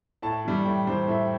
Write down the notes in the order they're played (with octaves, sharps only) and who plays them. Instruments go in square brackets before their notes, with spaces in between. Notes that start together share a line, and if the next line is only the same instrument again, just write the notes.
[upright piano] A2 A5
E3 G3
A2 G5
E3 G3 C5
A2 E5